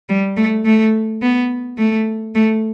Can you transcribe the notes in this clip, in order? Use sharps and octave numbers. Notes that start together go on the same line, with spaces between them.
G3
A3
A3
B3
A3
A3